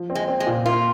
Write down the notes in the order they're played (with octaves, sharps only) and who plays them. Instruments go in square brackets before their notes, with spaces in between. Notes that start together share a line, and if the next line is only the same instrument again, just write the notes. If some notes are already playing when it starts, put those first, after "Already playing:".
Already playing: [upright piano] F3
C4
[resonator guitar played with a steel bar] G#3
[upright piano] C4
[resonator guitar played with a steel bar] G#3
[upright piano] A#2
[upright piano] A#3 [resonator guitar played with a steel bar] F4